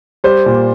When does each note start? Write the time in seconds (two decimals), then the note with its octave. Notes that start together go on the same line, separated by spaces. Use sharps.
0.24 G3 C5
0.46 A#2